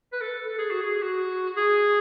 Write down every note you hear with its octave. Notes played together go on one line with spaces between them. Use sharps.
B4
A4
A4
G#4
F#4
G#4
F#4
G#4